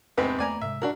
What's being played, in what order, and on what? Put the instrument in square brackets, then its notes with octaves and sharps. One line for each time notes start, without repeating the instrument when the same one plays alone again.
[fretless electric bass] E2 [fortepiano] G#2 C3 C4 [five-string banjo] B3 B4
[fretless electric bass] E2 A3 A#3 [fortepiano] D5 G#5 A#5
[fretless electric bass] G#2 C3 G#3 [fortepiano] E5
[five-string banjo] D4 F#4 A#4